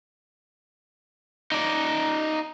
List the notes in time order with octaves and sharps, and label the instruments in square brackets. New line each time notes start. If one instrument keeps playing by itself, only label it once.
[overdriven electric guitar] D#4 D5